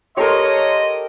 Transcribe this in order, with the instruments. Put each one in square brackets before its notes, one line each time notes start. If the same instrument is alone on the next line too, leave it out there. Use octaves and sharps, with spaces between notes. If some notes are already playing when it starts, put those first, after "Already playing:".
[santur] G4 A4 A#4 [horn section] C#5 C6 [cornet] D#5